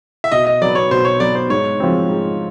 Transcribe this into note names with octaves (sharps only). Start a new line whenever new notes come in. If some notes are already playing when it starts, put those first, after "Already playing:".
E5
B2 D#5
D#5
F#3 B3 D5
C#5
B2 C5
C#5
F#3 B3 D5
C5
G#2 C#5
F3 G#3 C4
G#2